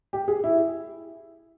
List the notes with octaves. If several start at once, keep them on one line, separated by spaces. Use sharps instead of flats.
G4
G#4
E4